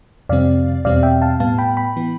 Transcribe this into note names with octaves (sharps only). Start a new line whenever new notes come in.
F2 C3 G3 C4 D5 F5
E2 B2 G3 C4 D5 F5
E5 G5
F5 A5
A2 G3 B3 F5 A5
G5 B5
G5 B5
E3 B3